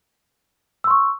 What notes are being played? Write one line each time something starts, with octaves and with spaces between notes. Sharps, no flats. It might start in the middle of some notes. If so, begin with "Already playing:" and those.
C6 C#6 E6